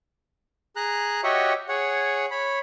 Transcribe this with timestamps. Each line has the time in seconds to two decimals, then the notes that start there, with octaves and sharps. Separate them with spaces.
0.76 G#4 A#5 F#6
1.24 F#4 G4 C#5 D#5 E5 F#5
1.69 G#4 C#5 F#5
2.31 C#5 B5